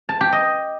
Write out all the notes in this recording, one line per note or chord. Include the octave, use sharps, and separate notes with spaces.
A5
G4
D#5